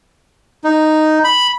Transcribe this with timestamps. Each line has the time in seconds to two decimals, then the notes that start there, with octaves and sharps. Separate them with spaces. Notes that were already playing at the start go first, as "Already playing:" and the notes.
0.64 D#4
1.24 B5